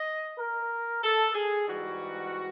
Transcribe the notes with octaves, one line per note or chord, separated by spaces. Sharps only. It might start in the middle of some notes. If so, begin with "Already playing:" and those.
Already playing: D#5
A#4
A4
G#4
G#2 E3 G3 F#4